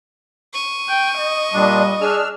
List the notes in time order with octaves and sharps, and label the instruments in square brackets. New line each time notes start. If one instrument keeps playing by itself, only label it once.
[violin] C#6 D#7
[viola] G5
D#5
[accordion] A#2 D4 [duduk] G3
[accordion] D4 E6 F6 [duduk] G#4